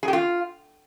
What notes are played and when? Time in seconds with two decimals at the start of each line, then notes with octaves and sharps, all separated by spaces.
0.03 G#4
0.08 G4
0.13 F4